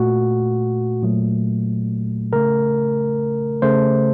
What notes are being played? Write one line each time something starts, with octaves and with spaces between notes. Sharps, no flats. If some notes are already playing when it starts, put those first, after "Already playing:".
Already playing: A#2 A3 F#4
A#2 F#3 A3
C#3 A3 A#4
C#3 A3 C5